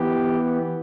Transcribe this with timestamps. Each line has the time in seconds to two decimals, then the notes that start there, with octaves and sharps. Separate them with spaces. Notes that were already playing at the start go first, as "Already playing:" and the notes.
Already playing: E3 B3 G4